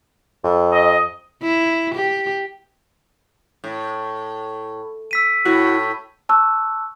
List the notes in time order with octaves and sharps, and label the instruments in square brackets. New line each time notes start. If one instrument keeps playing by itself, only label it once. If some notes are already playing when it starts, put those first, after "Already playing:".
[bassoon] F2
[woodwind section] D#5
[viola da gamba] E4
G4
[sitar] A2
[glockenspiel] E6 B6 D#7
[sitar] A2 [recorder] E4 [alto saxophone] F#4
[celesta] A5 C#6 E6 F#6